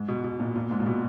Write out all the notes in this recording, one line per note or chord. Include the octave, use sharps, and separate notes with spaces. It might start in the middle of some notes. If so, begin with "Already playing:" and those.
Already playing: G#2
B2
B2
A#2
A#2
G#2
A#2
B2